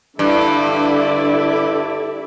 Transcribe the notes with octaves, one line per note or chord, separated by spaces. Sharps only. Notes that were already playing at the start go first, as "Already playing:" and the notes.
G2 D3 E4 D5